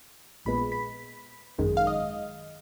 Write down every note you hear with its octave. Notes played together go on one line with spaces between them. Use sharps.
A#1 A#2 G#3 B3 B5
B5
G#1 F#2 D#3 G#3
F5
D#5